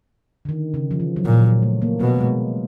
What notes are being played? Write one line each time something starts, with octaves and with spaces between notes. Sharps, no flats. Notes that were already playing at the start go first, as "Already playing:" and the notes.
D3
D#3
C#3
F3
E3
F#3
A#2 F3
F#3
A3
A#3
B2 B3
G#3